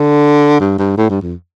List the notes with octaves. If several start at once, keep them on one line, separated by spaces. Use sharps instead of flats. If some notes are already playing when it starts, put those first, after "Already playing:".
Already playing: D3
G2
G2
A2
G2
F2